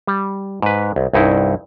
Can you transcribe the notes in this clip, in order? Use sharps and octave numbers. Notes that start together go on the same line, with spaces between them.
G3
G#2 B4
C2
C2 G2 D#4 E4